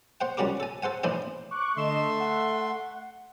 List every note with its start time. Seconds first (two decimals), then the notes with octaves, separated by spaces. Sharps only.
0.21 C5 F#5 G5
0.37 C#2 G3 C#4 F#4 A#4 D6
0.60 A4 G#5
0.82 A4 C5 F#5 G#5
1.03 A2 E3 D4 E4 C5 G#5
1.51 C#6 D6 F#6
1.76 D3 A3 D#5 E5 C6 E7
2.20 F#5